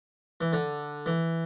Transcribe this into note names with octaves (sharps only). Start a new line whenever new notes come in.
E3
D3
E3